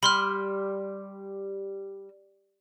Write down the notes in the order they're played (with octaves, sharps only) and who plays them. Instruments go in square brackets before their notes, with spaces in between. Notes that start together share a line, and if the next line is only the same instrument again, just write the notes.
[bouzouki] G3 [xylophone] B5 C6 F6